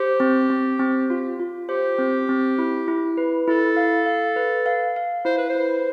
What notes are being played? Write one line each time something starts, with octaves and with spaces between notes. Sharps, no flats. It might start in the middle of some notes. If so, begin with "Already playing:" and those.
Already playing: G4 C5
C4
C4
C4
F4
F4
G4 C5
C4
C4
E4
E4
B4
E4 A4
F5
F5
B4
F5
F5
E4 C5
B4
C5
B4